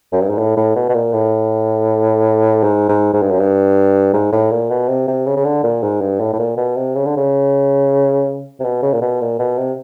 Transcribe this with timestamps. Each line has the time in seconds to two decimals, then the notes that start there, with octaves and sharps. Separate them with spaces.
0.12 F#2
0.21 G2
0.30 G#2
0.38 A2
0.57 A2
0.76 B2
0.89 B2
0.94 A#2
1.13 A2
2.63 G#2
2.89 G#2
3.13 G#2
3.22 G2
3.30 F#2
3.40 G2
4.13 G#2
4.32 A2
4.51 A#2
4.70 B2
4.88 C3
5.08 C3
5.26 C#3
5.37 C#3
5.45 D3
5.63 A#2
5.83 G#2
6.01 G2
6.20 A2
6.33 A2
6.39 A#2
6.57 B2
6.76 C3
6.95 C#3
7.05 D3
7.17 C#3
8.60 C3
8.64 B2
8.83 C#3
8.93 A#2
9.01 B2
9.21 A#2
9.39 B2
9.58 C3